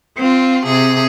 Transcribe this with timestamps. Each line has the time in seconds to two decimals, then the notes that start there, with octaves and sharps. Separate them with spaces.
0.16 C4 F4
0.64 C3 G#4